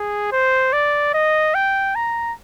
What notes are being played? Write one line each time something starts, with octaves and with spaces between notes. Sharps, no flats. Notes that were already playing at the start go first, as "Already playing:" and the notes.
Already playing: G#4
C5
D5
D#5
G5
A#5